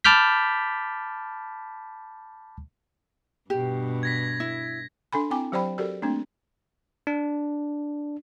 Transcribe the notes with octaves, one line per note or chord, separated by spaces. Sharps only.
A5 B5 D6 F6 G6 B6
G2 B2 G4
G#6 A#6 B6
E4
D4 A4 G#5 B5
C4 E4 G5 G#5 D6
F#3 G4 C5 D5 G5 B5
F#4 G4 A4 A#4 D5
A3 A#3 C4 D4
D4